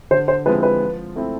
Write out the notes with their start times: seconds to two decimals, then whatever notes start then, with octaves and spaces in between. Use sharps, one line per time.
0.11 D3 C5
0.28 C5
0.46 F3 G#3 C4 E4 B4
0.63 B4
0.81 F3
1.16 A3 C4 E4